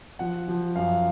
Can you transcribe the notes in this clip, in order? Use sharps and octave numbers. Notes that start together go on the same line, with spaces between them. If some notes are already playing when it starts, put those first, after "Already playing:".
F3 F#5
F3
F#2 F5